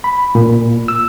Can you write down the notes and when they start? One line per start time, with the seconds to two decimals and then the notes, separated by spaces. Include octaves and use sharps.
0.04 B5
0.35 A#2
0.88 E6